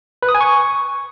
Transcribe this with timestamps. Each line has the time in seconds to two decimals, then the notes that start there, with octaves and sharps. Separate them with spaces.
0.22 B4
0.29 D#6
0.35 G#5
0.41 C#6